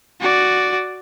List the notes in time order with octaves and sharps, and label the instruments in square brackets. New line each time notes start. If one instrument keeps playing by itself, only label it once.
[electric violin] F#4 D5